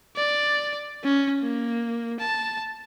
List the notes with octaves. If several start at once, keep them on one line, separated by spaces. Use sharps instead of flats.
D5
C#4
A#3
A5